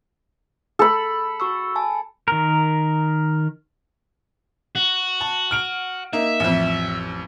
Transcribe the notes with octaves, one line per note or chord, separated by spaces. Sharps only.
A4 B5
F#4 C#6 E6
G#5 A5
D#3 A#4
F#4
A5
F6 D7 F7
A#3 D#4 E5
A1 F2